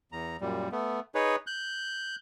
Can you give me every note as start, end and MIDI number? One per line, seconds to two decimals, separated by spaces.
0.12 0.37 40
0.12 0.37 82
0.41 0.69 42
0.41 0.69 46
0.41 0.69 55
0.72 1.00 57
0.72 1.00 59
1.15 1.36 63
1.15 1.36 68
1.15 1.36 71
1.15 1.36 73
1.47 2.16 90
1.47 2.16 91